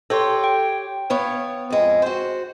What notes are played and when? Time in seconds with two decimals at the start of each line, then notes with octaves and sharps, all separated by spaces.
0.10 G4 A4 C#5 C6
0.44 G5
1.10 B3 C#5 F5
1.70 F2 G#3
2.02 F#4 C5